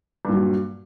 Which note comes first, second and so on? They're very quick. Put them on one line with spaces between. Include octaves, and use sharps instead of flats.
G2 A#2 F#3